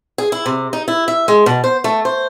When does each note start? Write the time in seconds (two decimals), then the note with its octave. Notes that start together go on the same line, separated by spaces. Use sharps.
0.18 G#4
0.32 E4
0.46 C3
0.73 D#4
0.88 E4
1.08 E5
1.28 G#3
1.46 B2
1.64 C5
1.84 A3
2.05 C5